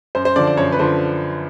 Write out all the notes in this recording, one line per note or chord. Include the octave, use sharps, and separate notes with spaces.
F#2 C5
C5
D3 F3 D5
D5
F#2 C#5
B4
D3 F3 C5